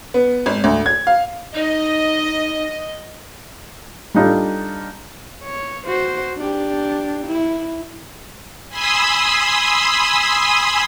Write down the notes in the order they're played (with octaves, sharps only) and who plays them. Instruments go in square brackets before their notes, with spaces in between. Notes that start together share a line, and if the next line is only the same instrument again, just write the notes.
[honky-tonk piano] B3
G#1
D2
G#6
F5
[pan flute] D#4 [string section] D#5
[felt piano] G3 D4 D#4 F4 G4 A4
[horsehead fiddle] C#5
F#4 C5
D4 G4
E4
[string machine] G#5 B5 C6 D#6 E6